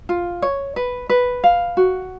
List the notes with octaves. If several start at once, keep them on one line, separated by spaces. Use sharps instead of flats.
F4
C#5
B4
B4
F5
F#4